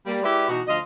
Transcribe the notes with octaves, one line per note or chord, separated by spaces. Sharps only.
G3 A#3
G#3 E4 G4 B4 D5 E5
B2 E3 D#4 F#4
D2 F3 F4 D#5